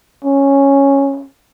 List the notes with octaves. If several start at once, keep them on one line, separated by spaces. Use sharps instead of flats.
C#4